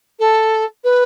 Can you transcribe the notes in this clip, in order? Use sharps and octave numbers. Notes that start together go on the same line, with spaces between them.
A4
B4